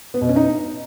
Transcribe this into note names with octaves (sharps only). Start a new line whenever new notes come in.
B3
B2
C#4
D#4